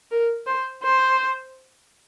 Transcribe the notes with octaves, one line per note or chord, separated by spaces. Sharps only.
A#4
C5
C5